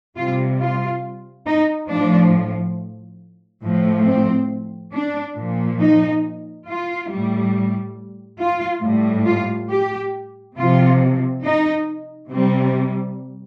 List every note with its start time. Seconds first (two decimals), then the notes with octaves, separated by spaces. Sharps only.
0.17 C3 G3 F4
0.60 F4
1.47 D#4
1.90 A2 F3 D4
3.63 A2 F3
4.07 C4
4.93 D4
5.37 A#2 F3
5.80 D#4
6.67 F4
7.10 A2 G3
8.40 F4
8.84 A2 G3
9.27 F4
9.70 G4
10.57 C3 F3 F4
11.44 D#4
12.30 C3 G3 C4